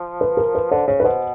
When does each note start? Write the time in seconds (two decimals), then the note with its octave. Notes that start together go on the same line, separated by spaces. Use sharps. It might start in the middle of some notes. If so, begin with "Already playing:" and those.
Already playing: F3
0.21 B4
0.37 A#4
0.55 B4
0.71 D3 C5
0.87 C#3 C#5
1.00 B4
1.04 B2 C5